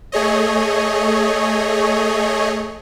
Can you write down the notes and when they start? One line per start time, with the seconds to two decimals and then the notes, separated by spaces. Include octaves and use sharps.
0.12 A3 G#4 C#5 D#5